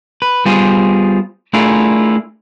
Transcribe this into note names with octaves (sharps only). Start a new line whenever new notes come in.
B4
G3 B3 F4 G#4 C5
A3 D4 E4 F4 G#4 A#4